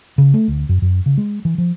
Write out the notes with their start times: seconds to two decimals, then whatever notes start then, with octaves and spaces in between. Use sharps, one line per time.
0.18 C#3
0.34 A3
0.48 D2
0.69 F#2
0.82 F#2
1.06 C#3
1.18 G#3
1.45 E3
1.58 F3